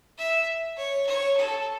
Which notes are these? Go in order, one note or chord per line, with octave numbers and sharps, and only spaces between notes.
E5
C#5
C#5
A4